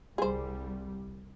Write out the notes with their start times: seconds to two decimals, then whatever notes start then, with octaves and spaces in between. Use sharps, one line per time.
0.18 C2 G3 G#4 C5